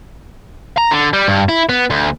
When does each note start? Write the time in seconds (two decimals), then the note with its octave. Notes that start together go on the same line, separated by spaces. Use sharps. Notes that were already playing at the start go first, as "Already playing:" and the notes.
0.77 A#5
0.91 D3
1.13 G3
1.28 G2
1.49 E4
1.69 B3
1.90 D2